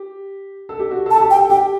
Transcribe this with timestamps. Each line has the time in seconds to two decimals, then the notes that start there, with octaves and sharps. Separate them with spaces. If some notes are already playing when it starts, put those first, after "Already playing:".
Already playing: G4
0.69 A4
0.79 G4
0.91 F#4
1.06 A4
1.11 A5
1.16 A4
1.21 G4
1.30 G5
1.35 A4
1.50 G4 G5